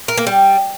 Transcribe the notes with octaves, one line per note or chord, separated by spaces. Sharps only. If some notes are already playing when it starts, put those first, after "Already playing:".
A#4
A#3
G3